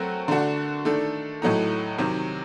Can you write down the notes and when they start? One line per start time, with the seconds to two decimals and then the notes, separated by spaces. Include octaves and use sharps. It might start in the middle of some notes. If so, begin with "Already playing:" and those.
Already playing: F#3 A3 C4 F#4 A#4
0.28 D3 A3 D4 F#4
0.85 D#3 A3 D4 A4
1.42 A2 F#3 A3 D#4
1.98 C3 D#3 F#3